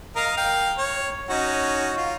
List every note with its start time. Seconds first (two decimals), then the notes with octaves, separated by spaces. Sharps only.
0.16 A#4 D#5 F5
0.37 F5 G5
0.78 C#5
1.29 C#4 D#4 F#4
1.97 F4